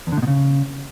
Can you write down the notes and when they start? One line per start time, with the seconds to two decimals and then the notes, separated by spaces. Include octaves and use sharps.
0.07 E2
0.12 D3
0.17 A2
0.22 B2
0.28 C#3